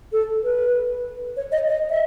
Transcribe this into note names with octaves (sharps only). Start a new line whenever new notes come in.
A4
B4
C#5
D#5
D#5
E5